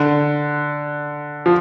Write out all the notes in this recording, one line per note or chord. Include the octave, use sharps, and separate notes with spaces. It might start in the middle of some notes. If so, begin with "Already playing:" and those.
Already playing: D3
F3